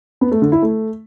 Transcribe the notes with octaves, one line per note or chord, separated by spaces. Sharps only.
B3
A3
D3
E4
A3